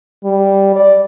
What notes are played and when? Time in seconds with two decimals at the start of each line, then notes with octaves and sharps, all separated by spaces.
0.24 G3
0.76 D5